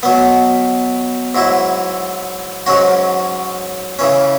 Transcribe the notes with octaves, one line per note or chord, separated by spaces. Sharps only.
B2 F#3 B3
G#2 F#3 E4
G#2 F#3 C#4 F#4
C#3 E3 C#4